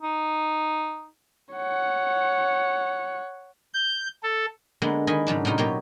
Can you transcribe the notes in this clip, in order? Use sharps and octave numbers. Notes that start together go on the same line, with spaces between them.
D#4
C#5 F#5
G6
A4
D3 G#3 A#3 B3
D#3 D#5 G#5 B5
G#2 C#3 F#3 D4
A2 C3 D#4 F4
B2 F#3 A#3 G4 C#5